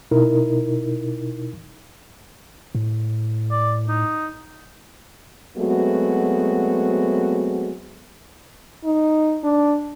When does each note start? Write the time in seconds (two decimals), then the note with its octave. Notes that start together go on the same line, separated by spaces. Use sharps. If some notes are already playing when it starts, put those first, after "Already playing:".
0.11 B2 D#4 E4 A#4
2.75 A2
3.51 D5
3.88 D#4
5.58 F#3 G#3 A3 B3 C4 F#4
8.84 D#4
9.44 D4